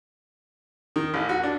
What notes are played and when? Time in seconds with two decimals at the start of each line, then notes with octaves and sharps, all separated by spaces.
0.96 D#3
1.14 A1
1.29 F#4
1.43 D4